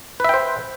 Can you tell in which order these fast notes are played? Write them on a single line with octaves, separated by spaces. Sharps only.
B4 E5 G5 C5